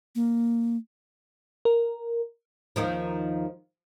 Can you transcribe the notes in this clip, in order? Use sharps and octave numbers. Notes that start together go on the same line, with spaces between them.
A#3
A#4
D#2 D#3 F3